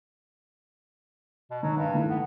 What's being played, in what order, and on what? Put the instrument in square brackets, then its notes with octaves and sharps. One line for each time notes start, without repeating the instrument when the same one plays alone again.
[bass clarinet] B2
[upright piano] D#3 [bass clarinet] F#3
[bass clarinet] G2 [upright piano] B5
[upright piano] D#3 E3 A3
[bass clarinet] B3